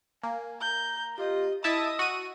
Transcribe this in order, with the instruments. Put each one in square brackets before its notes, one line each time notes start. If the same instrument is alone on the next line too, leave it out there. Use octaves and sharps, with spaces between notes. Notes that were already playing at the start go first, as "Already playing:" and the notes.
[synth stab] A#3 [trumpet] G#5
[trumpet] A#5 [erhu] G6
[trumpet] F4 [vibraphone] G4 [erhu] D#5
[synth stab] E4 E5 A5 [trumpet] D#5 [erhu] D#6 [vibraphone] E6
[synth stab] F#4 D#7